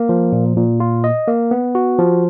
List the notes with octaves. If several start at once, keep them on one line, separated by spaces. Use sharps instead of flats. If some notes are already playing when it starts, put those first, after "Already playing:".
Already playing: A#3
F3
A#2
A#2
F4
D#5
A#3
B3
F#4
F3